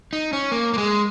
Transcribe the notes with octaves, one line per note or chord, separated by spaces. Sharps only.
D#4
C#4
A#3
A#3
G#3